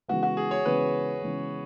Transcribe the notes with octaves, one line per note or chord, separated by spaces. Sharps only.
C#3 E3 G#3 B3 F#4
F#4
G#4
C#5
C#3 E3 G#3 B3 B4
C#3 E3 G#3 B3